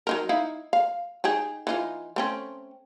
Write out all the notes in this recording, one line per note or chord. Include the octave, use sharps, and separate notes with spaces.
F#3 D#4 A#4
D#4 E4 F5
F5
D#4 G4 G#4
E3 D#4 F4
A3 C4 C#4